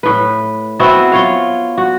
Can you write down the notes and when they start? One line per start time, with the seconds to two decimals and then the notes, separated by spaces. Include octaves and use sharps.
0.03 A2 B4
0.79 B3 C4 E4 F#4
1.12 F4 C#5 F5
1.77 F#4